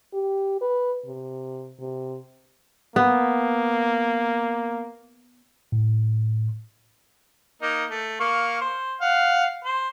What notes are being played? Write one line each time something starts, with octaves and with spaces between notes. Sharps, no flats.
G4
B4
C3
C3
A#3 B3
A2
A#3 D#4
A3
A#3 F5 C#6
C5
F5 F#5
C5